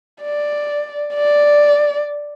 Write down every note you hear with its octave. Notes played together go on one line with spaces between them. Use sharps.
D5
D5